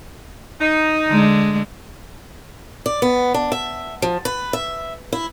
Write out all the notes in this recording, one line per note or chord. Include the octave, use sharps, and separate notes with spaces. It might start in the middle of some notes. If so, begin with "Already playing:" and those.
D#4
D3 G#3
D5
B3
D4
E5
F3
B4
E5
E4